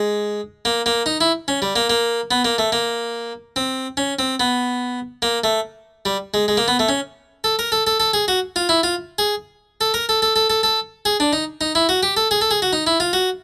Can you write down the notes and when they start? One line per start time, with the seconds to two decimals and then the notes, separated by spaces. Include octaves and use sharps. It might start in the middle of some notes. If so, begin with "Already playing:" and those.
Already playing: G#3
0.65 A#3
0.86 A#3
1.06 D#4
1.21 E4
1.48 C#4
1.62 G3
1.76 A#3
1.90 A#3
2.31 B3
2.45 A#3
2.58 A3
2.72 A#3
3.56 C4
3.97 C#4
4.19 C4
4.40 B3
5.22 A#3
5.44 A3
6.05 G3
6.34 G#3
6.48 G#3
6.57 A#3
6.68 B3
6.79 A3
6.89 C#4
7.44 A4
7.59 A#4
7.72 A4
7.87 A4
8.00 A4
8.14 G#4
8.28 F#4
8.56 F4
8.69 E4
8.83 F4
9.18 G#4
9.81 A4
9.94 A#4
10.09 A4
10.22 A4
10.36 A4
10.50 A4
10.63 A4
11.05 G#4
11.20 D4
11.33 D#4
11.61 D#4
11.75 E4
11.89 F#4
12.03 G4
12.17 A4
12.31 G#4
12.41 A4
12.51 G#4
12.62 F#4
12.73 D#4
12.87 E4
13.00 F4
13.13 F#4